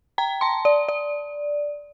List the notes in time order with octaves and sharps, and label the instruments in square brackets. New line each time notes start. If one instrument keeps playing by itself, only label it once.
[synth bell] G5 A#5
A5 C6
D5
D5